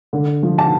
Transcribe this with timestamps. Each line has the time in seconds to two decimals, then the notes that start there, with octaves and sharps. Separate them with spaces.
0.13 D3
0.43 F3
0.58 A5